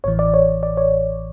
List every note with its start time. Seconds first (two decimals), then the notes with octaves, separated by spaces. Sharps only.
0.04 A1 A2 E3 C#5
0.19 D5
0.34 C#5
0.63 D5
0.77 C#5